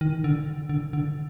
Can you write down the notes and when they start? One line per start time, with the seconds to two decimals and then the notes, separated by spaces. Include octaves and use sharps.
0.01 D#3
0.24 D3
0.69 D3
0.93 D3